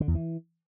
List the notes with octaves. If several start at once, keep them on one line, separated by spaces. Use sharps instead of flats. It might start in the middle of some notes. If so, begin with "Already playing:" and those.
D3
E2
E3